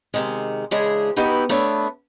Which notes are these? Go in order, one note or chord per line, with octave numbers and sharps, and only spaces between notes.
C3 D#3 G#3
C#3 E3 G#3 D4 G#4
B3 D#4 E4 F#4 G4 B4
A3 B3 D4 C#5 E5